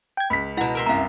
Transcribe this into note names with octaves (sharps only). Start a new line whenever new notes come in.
G5 G#6
C#2 B5 B6
B2 E4 F#5 A#5
A#4 E5 C6
C2 F#2 F5 A#5